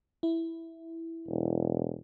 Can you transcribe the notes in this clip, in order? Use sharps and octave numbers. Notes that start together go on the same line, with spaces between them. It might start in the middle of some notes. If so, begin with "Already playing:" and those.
E4
E1